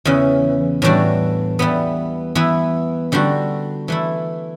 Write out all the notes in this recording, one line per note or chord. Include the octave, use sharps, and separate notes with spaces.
E2 C#3 E3
A2 E3 G3 D4 F#4
E3 G3 B3
E3 B3 E4
D3 G3 D4 F#4
E3 A3 E4